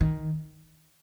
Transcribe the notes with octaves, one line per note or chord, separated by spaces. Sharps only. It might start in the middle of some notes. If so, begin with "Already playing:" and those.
D#3